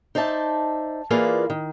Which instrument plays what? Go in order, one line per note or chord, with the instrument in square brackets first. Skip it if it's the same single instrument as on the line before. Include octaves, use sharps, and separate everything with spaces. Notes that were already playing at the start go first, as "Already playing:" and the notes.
[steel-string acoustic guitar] D#4 C5 D5 E5 A5
E3 A#3 F4 G#4 B4 D5
D#3